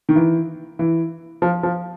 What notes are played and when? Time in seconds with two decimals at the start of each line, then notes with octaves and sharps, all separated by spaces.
0.09 D#3
0.16 E3
0.79 E3
1.42 F3
1.63 F3